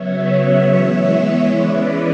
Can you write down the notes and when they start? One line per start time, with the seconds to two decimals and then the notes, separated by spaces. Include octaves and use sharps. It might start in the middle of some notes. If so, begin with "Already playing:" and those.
Already playing: C#3 F#3 B3 C#5 E5
0.68 E3 G#3 B3
1.49 E3 G#3 C#4 B4 D5